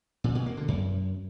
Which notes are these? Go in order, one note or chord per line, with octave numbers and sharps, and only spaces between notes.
A#2
B2
A#3
D3
F#2